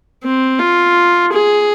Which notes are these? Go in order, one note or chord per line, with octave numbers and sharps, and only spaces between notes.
C4
F4
G#4